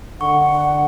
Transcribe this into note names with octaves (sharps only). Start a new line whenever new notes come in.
D3 F#5 C#6